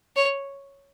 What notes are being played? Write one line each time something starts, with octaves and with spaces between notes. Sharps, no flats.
C#5